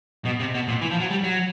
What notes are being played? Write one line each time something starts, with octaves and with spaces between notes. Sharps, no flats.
B2
C3
B2
A#2
E3
F3
F#3
G3
F#3